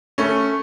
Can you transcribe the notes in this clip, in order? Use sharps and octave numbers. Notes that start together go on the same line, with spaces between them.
A3 C#4